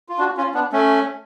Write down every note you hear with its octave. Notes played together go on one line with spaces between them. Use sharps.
F4
D4 F#4
C#4 F4
B3 D4
A3 C#4